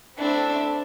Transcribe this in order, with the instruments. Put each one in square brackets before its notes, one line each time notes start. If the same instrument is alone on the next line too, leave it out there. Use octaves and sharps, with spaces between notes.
[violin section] A3 C4 E4 A4 E5 [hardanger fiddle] D4